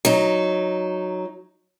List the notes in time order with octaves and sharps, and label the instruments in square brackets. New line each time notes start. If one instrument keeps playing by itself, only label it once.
[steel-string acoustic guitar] F#3 D#4